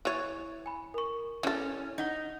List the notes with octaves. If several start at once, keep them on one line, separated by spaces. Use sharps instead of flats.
E3 C#5 F#6 A6 D#7
G#5 B5
A#4 C#6
E3 C#4 A4
D#4 D#5 F#5 G7